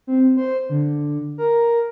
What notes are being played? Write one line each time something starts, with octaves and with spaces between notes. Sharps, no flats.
C4
C5
D3
A#4